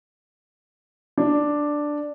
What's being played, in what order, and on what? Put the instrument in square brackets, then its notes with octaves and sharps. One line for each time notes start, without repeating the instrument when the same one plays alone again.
[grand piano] D4